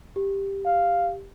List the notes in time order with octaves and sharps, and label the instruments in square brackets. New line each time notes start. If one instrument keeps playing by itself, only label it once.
[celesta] G4
[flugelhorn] F5